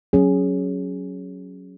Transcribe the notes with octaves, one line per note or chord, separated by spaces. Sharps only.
F#3 C#4 G#4